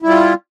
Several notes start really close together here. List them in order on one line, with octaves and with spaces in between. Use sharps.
E4 G3 F4